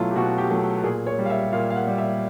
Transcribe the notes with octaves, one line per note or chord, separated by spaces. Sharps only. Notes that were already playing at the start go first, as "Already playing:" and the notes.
Already playing: B2 F#3 A3 E4 F4
G4
B2 F#4
G4
F#3 A3
A#2 G#4
C#5
G3
F5
E5
A#2 F5
F5
F#5
G3
E5